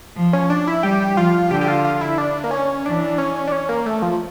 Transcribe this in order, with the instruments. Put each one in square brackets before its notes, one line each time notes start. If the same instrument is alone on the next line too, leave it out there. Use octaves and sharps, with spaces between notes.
[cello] F3
[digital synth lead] C#4
D4
E4
[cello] G3 [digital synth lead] G4
[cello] F3 [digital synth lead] F4
[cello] D3 [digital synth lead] G4
[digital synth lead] G4
F4
F4
E4
D4
A#3
C#4
[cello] E3 [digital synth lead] D4
[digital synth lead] C#4
D4
C#4
A#3
A3
F3